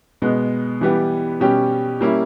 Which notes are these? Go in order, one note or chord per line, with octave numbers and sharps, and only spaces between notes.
B2 G#3 B3
E3 G3 B3 G4
B2 G3 C#4 G4
G3 A#3 C#4 E4